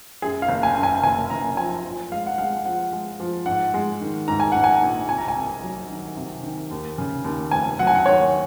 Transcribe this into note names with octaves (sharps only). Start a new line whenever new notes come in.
F#2 G#4
F5
F#1
G#5
F#2
G#5
F#1 G#5
F#1 A#5
F3 G#5
F3
G#3 F5
F#5
G#3 F5
F3 F#5
G#3
F3
G#2 F#5
G#3
D#3
G#2 A#5
G#5
G#2 F#5
G#5
A#1
C3 G#5
A#5
G#5
C2
F#3
D#3
C3
D#3
D#2
C#3
D#2
F1 G#5
F#3 F#5
G#5
F#5
D#2 C#5